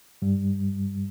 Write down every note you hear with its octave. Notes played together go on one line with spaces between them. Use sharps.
G2 G3